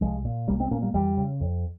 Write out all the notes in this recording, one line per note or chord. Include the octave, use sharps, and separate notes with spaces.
C2 F3 G#3
A#2
C2 G3 A#3
G#3 C4
A#2 A#3 C#4
G3 A#3
F2 E3 G3
C#3
F2